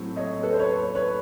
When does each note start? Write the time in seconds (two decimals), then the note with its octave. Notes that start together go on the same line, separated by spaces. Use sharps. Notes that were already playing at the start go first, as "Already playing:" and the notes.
Already playing: A2 F#3 A3 C4
0.16 C#5 D#5
0.42 A4 B4
0.53 C5
0.59 B4 C#5
0.95 B4 C#5